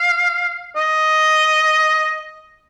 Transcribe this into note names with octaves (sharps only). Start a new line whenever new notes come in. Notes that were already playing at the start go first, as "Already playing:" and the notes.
Already playing: F5
D#5